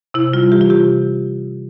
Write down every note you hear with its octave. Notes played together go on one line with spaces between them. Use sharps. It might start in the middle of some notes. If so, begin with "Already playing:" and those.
C3 E4
G3 F4
E3 G4
F4
C3 G4